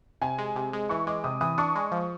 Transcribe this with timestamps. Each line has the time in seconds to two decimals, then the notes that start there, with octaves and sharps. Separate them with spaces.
0.22 C3 G#5
0.38 G#3
0.56 C3
0.73 G#3
0.89 E3 C#6
1.07 G#3 D6
1.24 C3 D#6
1.41 E3 D#6
1.58 D4 C#6
1.76 G#3
1.92 F3